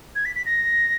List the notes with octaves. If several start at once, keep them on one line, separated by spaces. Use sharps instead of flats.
G#6
B6
B6
A#6